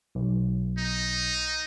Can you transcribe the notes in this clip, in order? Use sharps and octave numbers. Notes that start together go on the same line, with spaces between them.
B1
D#4